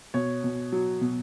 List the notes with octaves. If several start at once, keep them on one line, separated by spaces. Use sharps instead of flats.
B2 C#5
B2
F#3
B2